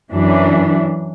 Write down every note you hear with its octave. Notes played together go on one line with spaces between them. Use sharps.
F#2 E3 D4